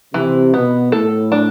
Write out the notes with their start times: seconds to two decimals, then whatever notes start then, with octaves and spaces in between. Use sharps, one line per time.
0.14 C3 E3
0.54 B2 B3
0.92 A2 A4
1.32 D4